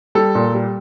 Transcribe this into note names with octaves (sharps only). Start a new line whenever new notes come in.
G3 A4
A#2
G3